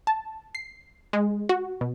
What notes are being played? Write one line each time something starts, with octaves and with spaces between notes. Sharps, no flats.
A5
C7
G#3
F#4
B2